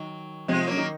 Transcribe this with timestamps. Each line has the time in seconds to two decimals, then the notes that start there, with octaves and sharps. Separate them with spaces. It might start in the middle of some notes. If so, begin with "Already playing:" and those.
Already playing: D#3 F#3
0.48 C3 F3 G#3 C4
0.67 F#3 A#3 C#4
0.77 D#3 D#4